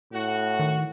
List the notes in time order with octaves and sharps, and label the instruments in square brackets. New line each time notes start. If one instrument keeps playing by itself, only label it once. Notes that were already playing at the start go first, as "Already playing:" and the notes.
[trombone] A2 [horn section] F#4
[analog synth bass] D#3